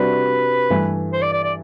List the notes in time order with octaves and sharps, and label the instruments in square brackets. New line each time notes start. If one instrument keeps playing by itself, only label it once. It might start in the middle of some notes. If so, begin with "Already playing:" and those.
Already playing: [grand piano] C3 G3 D4 F#4 C5 [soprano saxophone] B4
[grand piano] G2 E3 A3
[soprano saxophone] C5
D5
D5
D5